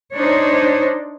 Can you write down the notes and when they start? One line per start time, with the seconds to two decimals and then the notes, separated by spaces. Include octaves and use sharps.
0.15 D4 D#4 C5 C#5